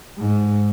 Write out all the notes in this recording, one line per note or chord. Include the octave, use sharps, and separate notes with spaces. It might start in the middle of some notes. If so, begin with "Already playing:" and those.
G#2